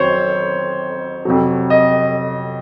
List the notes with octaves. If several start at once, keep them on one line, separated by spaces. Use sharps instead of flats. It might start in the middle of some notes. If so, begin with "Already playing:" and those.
Already playing: F2 D#3 F#3 C5 C#5
F2 C3 F#3
D#5